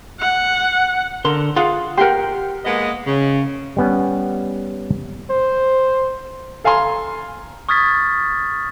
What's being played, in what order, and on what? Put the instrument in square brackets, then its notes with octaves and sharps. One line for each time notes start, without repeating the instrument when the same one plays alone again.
[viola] F#5
[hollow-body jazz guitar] D3 C6 [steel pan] A#4
[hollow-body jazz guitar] F4 G#4 F5 [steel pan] F#5
[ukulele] G4 A#4 [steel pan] F#5 G5 C6
[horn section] G#3 A#3 B3 A#4 D#5 F#5
C#3
[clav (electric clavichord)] G3 B3 C#4
[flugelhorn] C5
[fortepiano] A4 F5 G#5 A#5 C6
[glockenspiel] C#6 D#6 F6 G#6 A6 B6